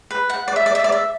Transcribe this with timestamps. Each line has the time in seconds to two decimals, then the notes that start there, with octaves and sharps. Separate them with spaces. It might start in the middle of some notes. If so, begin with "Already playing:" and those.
0.11 B4
0.30 F#5
0.48 D5
0.56 E5
0.66 D5
0.75 E5
0.84 D5
0.92 E5